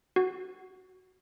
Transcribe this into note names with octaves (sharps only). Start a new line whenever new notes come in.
F#4